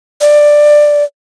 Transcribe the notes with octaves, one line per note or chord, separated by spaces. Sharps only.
D5